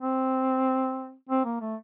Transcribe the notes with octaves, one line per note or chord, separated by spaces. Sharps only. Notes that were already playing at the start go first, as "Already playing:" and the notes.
C4
C4
A#3
A3